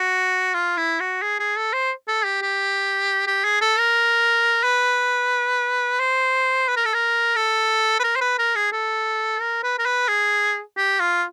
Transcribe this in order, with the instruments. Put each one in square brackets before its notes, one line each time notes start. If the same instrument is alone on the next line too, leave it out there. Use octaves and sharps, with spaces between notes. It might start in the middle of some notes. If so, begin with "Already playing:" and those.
Already playing: [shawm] F#4
F4
E4
F#4
G#4
G#4
A4
C5
A4
G4
G4
G4
G#4
A4
A#4
B4
C5
B4
A#4
A4
A#4
A4
B4
A#4
C5
B4
A#4
G#4
A4
A#4
B4
A#4
B4
G#4
G4
F4